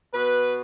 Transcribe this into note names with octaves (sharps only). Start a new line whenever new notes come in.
B2 B3 B4